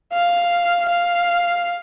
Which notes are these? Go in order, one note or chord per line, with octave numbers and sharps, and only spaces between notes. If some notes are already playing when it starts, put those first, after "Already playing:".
F5
F5